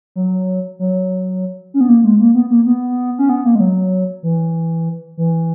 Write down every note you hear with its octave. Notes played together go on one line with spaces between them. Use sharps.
F#3
F#3
C#4
B3
A#3
G#3
A#3
B3
A#3
B3
C#4
B3
A#3
G#3
F#3
E3
E3